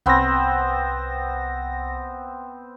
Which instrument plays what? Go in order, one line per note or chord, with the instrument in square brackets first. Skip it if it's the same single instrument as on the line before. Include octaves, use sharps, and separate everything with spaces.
[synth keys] C2 A#6 [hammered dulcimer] B3 C4